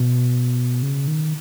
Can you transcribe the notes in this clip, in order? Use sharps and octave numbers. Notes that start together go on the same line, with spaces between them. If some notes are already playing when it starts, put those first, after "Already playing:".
Already playing: B2
C#3
D#3